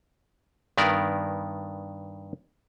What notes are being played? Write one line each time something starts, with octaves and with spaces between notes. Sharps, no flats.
G2 D#3 B3 A#4 D5